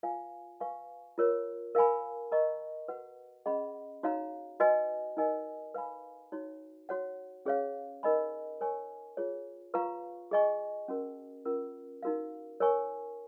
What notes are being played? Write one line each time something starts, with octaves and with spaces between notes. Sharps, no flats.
F4 B4 F5 G#5
B4 F5 G#5 C#6
F4 A#4 C#5
A#4 F5 G#5 B5
A#4 D#5 A#5 C#6
F#4 B4 F#5
C#4 G#4 D#5 F#5 B5
D#4 F#4 C#5 F5 A#5
F#4 B4 D#5 G#5
D#4 A#4 D#5 G#5
B4 F5 G#5 B5
D#4 F#4 C#5
F#4 C#5 F#5
C#4 G#4 C#5 F5
D#4 A#4 D#5 G#5 B5
A#4 C#5 G#5 C#6
F4 G#4 C#5
F4 B4 F5 A#5 C#6
G#4 D#5 G#5 C#6
C#4 F#4 A#4
C#4 F4 A#4
D#4 F#4 A#4 F5
A#4 C#5 G#5 C#6